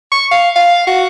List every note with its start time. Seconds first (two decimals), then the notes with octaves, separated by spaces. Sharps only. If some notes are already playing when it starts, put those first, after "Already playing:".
0.12 C#6
0.31 F5
0.56 F5
0.87 F#4